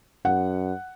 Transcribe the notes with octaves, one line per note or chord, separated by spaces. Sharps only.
F#2 F#5